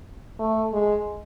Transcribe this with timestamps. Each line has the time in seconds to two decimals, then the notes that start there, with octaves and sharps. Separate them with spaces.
0.39 A3
0.73 G#3